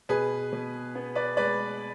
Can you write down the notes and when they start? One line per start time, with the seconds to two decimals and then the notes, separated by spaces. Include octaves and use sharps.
0.09 B2 G#4 B4
0.53 B2
0.95 B3
1.15 B4 D5
1.37 G#3 B4 D5